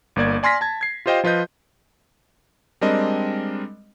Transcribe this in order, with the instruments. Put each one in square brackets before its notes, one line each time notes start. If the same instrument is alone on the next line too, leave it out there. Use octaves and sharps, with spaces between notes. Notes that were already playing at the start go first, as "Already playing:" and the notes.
[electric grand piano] G1 A#3 D5 G#6
D5 G#5 C6 F6 A#6 B6
A5 G#6
G#6 C7
F4 G4 C5 D#5 F5 G5
F3 F4 B4 D#5 G6
G3 G#3 C4 D4 A#4 D#5